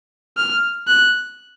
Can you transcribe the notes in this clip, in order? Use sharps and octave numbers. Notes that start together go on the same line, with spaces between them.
F6
F#6